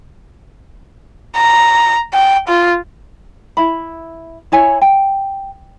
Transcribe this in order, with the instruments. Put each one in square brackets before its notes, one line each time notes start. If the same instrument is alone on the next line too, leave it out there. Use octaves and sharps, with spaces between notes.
[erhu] A#5
G5
F4
[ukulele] E4 E5 B5
E4 C#5 G#5
G5